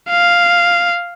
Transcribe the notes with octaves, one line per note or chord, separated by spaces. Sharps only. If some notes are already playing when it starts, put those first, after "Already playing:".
F5